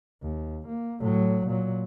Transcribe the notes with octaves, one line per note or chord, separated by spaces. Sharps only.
D#2
A#3
A2 F#3
A#2 F#3